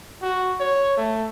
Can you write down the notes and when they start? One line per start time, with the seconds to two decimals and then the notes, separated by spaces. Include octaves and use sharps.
0.22 F#4
0.60 C#5
0.97 A3